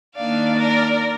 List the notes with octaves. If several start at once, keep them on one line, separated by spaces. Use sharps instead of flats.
D#3 A#3 D4 D5 F5
A#4 D5